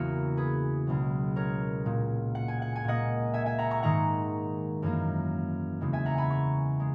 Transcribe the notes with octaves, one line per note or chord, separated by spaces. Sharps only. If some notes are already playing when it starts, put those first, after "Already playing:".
Already playing: E2 C#3 E3 A#3 F#4 A#4
G#4 B4
C#2 B2 F#3
A#4 C#5
A#2 G#3
F#5
G#5
F#5
G#5
A#2 A#3 D#5 F#5
E5 G#5
E5 G#5
F#5 A#5
A#5 C#6
G#2 D#3 G#3 F#5 A#5
F#2 E3 A#3
E2 C#3 E3 G#3
E5 G#5
F#5 A#5
G#5 B5
A#5 C#6
G#3